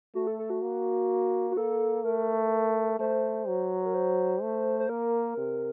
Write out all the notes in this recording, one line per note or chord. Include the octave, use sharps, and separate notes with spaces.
A3 F#4
A4
A4
F#4
A#3
F#4
A#3 A4
A3 A#4
A3 C5
F#3
A#4
C5
A3
C5
A#3 A#4
C3